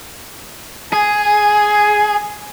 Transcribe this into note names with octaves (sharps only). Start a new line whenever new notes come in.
G#4 G#5